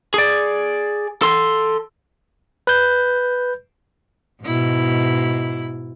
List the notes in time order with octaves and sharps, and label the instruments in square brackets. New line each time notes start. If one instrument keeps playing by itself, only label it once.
[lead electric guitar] G#4 D5
A4 C6
[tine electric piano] B4 G6
[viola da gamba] G#2 B2 E4